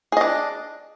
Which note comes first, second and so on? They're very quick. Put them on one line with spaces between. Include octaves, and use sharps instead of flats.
G#4 D#5 D4